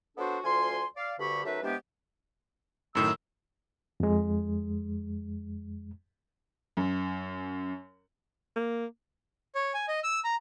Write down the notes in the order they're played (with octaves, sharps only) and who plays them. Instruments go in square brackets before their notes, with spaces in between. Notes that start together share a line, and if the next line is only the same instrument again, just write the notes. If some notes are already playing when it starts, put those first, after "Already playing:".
[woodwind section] F#3 B3 D4 F#4 A4 C5
D2 F3 G#5 C6
D5 F5
D2 G2 D3 G4 B5 C#6
F#2 A3 D#4 B4 E5
C3 E3 G#3 B3 D4 G4
[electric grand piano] F#2 A2 D#3 [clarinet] E6
[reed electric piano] F2 G#3
[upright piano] F#2
[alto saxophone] A#3
[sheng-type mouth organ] C#5
G#5
D#5
E6
A#5